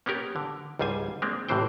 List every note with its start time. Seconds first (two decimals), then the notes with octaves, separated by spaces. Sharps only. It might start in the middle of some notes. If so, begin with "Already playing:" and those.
0.06 A#3 B3 C#4 G4 A#4
0.36 D3
0.79 C#2 G#2 G3 C5 G#5
1.22 G#3 A#3 C4 D4
1.49 A1 A2 C3 E3 C5 G5